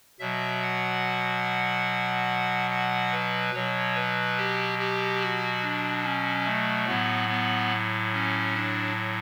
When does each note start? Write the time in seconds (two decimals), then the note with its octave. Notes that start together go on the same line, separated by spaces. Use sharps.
0.20 B2 F#3 E5
0.62 F#5
2.71 F#5
3.12 B4
3.54 B2 F#3 C#5
3.95 B4
4.37 G4
4.79 G4
5.21 F#4
5.62 D4
6.04 C#4
6.46 A3
6.87 A2 F#3 B3
7.29 B3
8.13 C#4
8.55 D4